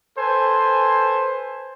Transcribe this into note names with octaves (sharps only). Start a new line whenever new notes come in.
A4 B4 C5 G#5